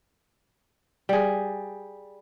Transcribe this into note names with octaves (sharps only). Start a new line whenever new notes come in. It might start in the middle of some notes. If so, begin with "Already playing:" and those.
G3 G#4